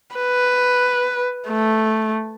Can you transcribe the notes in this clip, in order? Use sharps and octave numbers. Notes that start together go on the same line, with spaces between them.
B4
A3